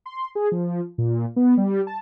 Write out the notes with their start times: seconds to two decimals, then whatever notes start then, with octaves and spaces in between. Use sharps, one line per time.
0.06 C6
0.35 G#4
0.52 F3
0.98 A#2
1.36 B3
1.57 G3
1.87 A5